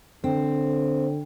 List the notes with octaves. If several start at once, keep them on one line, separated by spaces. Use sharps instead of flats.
D3 C4